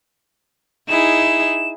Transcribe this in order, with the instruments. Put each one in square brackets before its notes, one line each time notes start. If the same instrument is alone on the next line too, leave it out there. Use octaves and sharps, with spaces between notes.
[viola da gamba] D#4 E4 G#4 [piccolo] E7